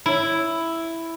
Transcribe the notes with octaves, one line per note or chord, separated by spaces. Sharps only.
E4